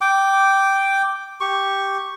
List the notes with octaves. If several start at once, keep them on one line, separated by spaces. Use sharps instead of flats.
G5 D6
G4 C#6